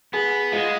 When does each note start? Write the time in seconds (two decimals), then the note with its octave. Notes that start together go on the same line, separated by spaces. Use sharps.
0.13 B3 G#4
0.52 G#3 F4